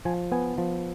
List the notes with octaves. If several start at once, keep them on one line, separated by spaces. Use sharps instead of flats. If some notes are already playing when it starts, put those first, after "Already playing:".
F3 G#5
B3 G#5
F3